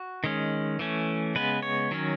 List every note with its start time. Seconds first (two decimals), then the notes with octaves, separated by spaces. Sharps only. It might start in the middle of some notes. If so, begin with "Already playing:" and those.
Already playing: F#4
0.24 D#3 G#3 C#4
0.79 E3 A3 C#4
1.35 C#3 G#3 B3 B4
1.63 C#5
1.91 D#3 F#3 C#4